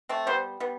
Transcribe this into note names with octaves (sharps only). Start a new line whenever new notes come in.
A3 C4
G3 B3 C5
G3 B3